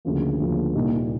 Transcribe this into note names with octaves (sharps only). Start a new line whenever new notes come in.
D2 C#3 F3 A#3
D2 C#3 F3 A#3
C2 A#2 G3 A#3 D#4